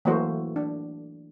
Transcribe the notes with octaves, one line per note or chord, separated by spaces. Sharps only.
E3 F#3 A3 A#3 F#4 C5
D4